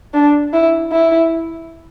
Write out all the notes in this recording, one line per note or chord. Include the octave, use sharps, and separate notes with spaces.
D4
E4
E4